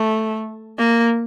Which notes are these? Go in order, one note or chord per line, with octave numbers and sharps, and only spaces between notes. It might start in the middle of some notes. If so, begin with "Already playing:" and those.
Already playing: A3
A#3